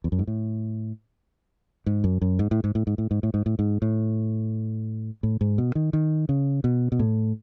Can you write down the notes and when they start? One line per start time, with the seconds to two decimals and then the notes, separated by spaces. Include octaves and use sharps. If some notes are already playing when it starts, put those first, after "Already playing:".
0.04 E2
0.12 F#2
0.19 G#2
0.27 A2
1.86 G#2
2.04 F#2
2.21 F#2
2.39 G#2
2.51 A2
2.64 G#2
2.75 A2
2.87 G#2
2.98 A2
3.11 G#2
3.23 A2
3.34 G#2
3.46 A2
3.59 G#2
3.82 A2
5.23 A2
5.41 G#2
5.58 B2
5.75 D#3
5.93 D#3
6.29 C#3
6.64 B2
6.92 B2
6.99 A2